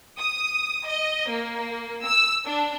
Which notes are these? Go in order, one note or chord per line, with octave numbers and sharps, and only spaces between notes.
D#6
D#5
A#3
E6
D4